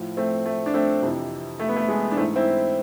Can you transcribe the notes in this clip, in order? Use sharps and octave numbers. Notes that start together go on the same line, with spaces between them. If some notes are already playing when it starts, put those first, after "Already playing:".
Already playing: A2 F3
A3 C4
A3
D4
A3 C4
F2 C3 E3
A3
B3
A3
G#3 B3
D4
G#2 E3 A3 C4
C4 E4